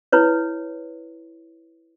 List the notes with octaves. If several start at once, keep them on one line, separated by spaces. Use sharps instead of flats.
E4 B4 C#5